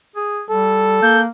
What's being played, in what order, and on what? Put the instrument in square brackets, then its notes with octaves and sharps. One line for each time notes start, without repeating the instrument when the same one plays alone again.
[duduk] G#4
[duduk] G3 [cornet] A4
[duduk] A#3 [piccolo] G6